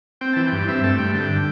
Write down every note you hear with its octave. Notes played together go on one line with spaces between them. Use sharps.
C4 G5
E3 A5
G5
G2
C4 E5
A3 A5
G2 G5
D3 G5